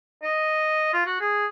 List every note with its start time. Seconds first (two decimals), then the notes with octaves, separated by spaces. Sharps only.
0.23 D#5
0.93 F4
1.06 F#4
1.21 G#4